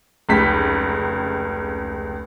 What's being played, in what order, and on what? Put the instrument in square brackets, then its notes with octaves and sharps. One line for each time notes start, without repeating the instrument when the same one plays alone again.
[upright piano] F1 C#2 B6